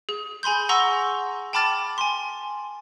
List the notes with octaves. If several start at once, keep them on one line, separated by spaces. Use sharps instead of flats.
G#4
G#4 G#5 B5 C6 G6
F#5 A#5 C6 C#6 E6 A#6
G5 A5 B5 D6 F6 A6
G#5 C6